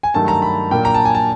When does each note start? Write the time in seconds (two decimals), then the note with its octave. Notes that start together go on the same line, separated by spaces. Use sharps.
0.03 G#5
0.14 G2 D#3 F#3 A3 A5
0.28 A#5
0.42 B5
0.71 A#2 F#3 A#3 D4 G5
0.85 A#5
0.94 A5
1.05 G#5
1.15 A5